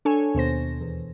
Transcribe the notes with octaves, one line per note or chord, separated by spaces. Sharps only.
D4 A4 C#5 G#5
D#2 B2 C5 A#6
E2